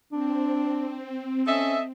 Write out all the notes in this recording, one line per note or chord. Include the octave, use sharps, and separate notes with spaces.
C4 D4
C#4 A4 D#5 E5